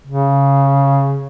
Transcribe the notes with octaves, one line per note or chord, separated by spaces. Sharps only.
C#3